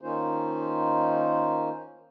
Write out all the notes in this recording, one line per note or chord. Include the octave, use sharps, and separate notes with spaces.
D#3 A#3 C#4 D#4 F4 C5